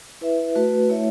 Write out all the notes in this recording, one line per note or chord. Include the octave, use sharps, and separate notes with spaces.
E4 B4 E5
A3 F#4 B4
A3 E4 C#5 E5